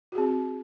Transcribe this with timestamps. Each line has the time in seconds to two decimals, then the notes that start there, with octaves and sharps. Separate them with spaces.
0.12 F#4
0.15 G#4
0.18 C4